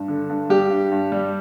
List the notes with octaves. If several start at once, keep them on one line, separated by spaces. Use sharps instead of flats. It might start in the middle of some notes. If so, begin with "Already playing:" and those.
Already playing: G2
D3
G2
G3 G4
G2
G2
G3